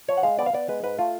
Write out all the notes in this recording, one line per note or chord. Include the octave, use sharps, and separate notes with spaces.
F3 C#5
F#5
G#3 F5
B3 D5
F5
B3 D5
G#3 B4
G#2 B4
A3 F4